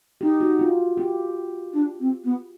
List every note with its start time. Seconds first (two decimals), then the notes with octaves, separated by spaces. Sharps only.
0.21 D#4 G4
0.40 F#4
0.59 F4
0.97 G4
1.73 D4
1.99 C4
2.24 B3